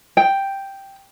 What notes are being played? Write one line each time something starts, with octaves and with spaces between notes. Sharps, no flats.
G5